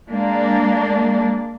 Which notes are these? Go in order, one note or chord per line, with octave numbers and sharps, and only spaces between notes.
G#3 A#3 D4